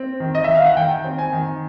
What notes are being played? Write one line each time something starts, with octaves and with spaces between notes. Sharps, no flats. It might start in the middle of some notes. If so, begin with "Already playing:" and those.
Already playing: C4
D#3
D#5
D#3 E5
F5
F#5
D#3 G5
C4
G#5
D#3